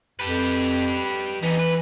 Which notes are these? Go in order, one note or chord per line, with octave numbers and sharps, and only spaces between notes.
F2 G4 B4
E3 B3 D#4
B4